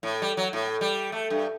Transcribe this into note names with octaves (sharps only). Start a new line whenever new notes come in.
A2
G3
F#3
A2
G3
A3
G2